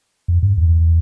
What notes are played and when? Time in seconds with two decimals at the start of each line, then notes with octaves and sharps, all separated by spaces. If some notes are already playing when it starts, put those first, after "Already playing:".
0.28 F2
0.43 G2
0.58 E2